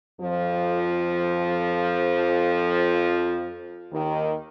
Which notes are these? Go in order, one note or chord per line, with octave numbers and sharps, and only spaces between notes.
F2 F3
D#2 D#3